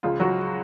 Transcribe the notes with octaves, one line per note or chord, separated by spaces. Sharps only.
C#2 C#3 F3 F4
F#3 F#4